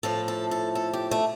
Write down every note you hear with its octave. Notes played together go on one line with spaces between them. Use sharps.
A2 F3 A4
A4
A4
A4
G4
A3